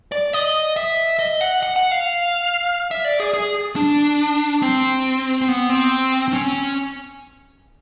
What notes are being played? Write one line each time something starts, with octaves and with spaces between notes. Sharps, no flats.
D5
D#5
E5
D#5
F#5
F#5
F#5
F5
E5
D5
G#4
G#4
D4
C4
C4
B3
C4
C4
C#4